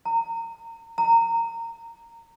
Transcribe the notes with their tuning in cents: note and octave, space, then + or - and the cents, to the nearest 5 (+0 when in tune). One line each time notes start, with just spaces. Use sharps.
A#5 -30
A#5 -20